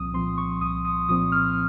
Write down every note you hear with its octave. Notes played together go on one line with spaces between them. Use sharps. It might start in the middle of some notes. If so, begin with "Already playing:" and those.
Already playing: C2 A#2 F3 C4 D#6
A#2 F3 C4 C6
C#6
C2 D#6
D#6
A#2 F3 C4 D#6
F6